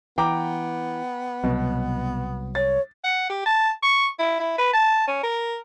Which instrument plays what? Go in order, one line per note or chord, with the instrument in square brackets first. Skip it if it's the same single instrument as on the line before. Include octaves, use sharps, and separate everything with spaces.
[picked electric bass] E3 [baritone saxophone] B3 [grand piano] G5 A#5 D6
[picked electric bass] C2 F#3 [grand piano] B2
[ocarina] C#5 [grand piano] A6
[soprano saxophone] F#5
G4
A5
C#6
E4
E4
B4
A5
C#4
A#4